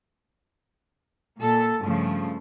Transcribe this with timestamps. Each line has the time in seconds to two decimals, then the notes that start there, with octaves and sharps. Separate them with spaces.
1.39 A#2 A4
1.82 G2 C#3 F3 A3